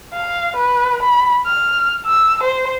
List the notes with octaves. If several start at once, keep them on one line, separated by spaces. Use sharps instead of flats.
F5
B4
B5
F6
E6
C5